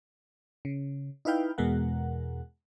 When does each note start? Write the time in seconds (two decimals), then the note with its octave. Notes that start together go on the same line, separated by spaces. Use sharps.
0.65 C#3
1.25 D#4 E4 B4 F5 G5
1.58 E2 B2 G#3 A#4 F#5